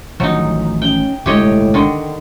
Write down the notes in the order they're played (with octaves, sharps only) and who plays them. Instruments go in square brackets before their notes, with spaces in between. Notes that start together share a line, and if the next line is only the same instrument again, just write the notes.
[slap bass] A1 D#3 F3 [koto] F#3 D#4
[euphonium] C#4 [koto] G5
[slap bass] G1 C3 G#3 [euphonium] A2 [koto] G4 C#5 D#5
[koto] D3 D#3